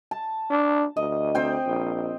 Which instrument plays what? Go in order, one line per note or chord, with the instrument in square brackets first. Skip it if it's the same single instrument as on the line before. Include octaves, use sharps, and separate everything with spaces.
[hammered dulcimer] A5
[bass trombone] D4
[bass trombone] D2 [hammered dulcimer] D#5
[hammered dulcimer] C4 C5 G5
[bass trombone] A#1